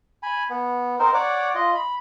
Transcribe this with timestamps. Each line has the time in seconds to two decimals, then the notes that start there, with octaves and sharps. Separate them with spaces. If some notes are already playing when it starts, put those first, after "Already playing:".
0.23 G#5 B5
0.50 B3
0.99 C4 D#4 A#4 C5
1.14 C#5 D5 F#5 D6
1.55 F4 D#5
1.75 B5